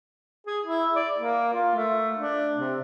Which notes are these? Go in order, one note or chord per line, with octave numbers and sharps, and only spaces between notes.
G#4
E4
D5
A#3
F4
A3
D4
C3